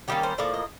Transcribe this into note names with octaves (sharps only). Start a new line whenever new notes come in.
D#3 G3 A#3 C#4 G4
C5
A2 F3 A#3 D5
D#5